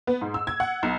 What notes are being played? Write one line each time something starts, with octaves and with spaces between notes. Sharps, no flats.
B3
G#2
E6
G#6
F#5
B1